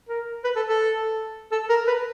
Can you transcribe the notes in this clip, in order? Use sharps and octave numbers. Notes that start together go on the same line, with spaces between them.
A#4
B4
A4
A4
A4
A#4
B4